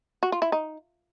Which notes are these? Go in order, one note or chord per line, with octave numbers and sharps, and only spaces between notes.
F#4
F4
E4
D#4